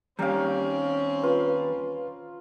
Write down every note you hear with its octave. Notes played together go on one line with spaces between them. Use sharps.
D#2 G3 C4 C#4 A#4 F5
F4 B4